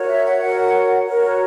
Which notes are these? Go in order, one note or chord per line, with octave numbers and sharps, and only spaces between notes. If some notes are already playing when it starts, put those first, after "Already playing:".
Already playing: F#4 A#4 C#5
E5
F#5
F#4 A#4 C#5
F#4 A#4 C#5
F#5